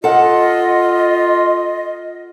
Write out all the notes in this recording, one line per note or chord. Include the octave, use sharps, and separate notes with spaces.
F4 A4 D#5 F#5